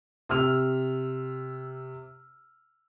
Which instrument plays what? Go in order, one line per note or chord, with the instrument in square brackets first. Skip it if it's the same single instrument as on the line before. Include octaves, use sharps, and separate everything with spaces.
[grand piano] C3 E6 F6 F7